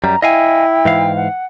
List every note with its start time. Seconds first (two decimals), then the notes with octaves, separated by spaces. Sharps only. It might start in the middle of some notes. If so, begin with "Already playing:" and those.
0.04 F#2 G3 A#5
0.22 E4 D#5 F5 G5 G#5
0.85 G#2 E3 F5
1.16 F#5